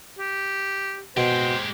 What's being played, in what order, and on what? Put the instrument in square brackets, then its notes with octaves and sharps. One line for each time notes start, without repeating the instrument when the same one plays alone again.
[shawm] G4
[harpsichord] B2 [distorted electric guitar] G#3 G4 [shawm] C5